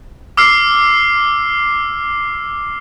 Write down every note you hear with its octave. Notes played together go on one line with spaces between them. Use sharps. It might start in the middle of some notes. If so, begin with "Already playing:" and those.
D6 E6 F6 C7